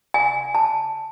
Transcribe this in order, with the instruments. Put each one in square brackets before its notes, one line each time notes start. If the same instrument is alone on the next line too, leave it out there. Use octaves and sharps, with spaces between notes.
[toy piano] G#5
A5